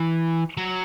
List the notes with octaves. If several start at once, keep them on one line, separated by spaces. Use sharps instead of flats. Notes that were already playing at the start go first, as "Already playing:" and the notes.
Already playing: E3
F#3